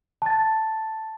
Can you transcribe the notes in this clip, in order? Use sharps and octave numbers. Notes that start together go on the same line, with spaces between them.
A5 A6